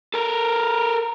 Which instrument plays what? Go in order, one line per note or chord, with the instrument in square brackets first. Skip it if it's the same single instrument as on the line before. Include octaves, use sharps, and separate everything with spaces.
[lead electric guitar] A4 A#4